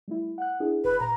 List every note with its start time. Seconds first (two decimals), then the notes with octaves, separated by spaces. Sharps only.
0.08 G3 A3 E4
0.38 F#5 F#6
0.60 D4 E4 G#4
0.84 G1 B4
1.00 A#2 A#5